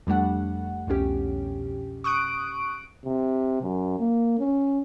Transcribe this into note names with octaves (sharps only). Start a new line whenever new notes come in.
F2 G3 A3 D4 F#5
C2 F2 B2 C#4 G4
C#6 D#6 F#6 D7
C3
F#2
A#3
C#4